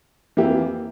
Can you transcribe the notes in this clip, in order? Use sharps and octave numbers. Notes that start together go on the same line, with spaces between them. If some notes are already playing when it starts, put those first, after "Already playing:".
F2 E3 A#3 E4 G4